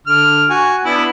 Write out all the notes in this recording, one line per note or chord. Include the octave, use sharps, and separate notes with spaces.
D3 F6
F#4 G#5
B3 D4 E4